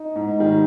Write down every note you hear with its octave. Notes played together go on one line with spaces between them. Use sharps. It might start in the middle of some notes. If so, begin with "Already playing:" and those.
Already playing: D#4
G#2
D#3 G3